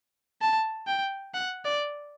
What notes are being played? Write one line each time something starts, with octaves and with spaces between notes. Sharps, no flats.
A5
G5
F#5
D5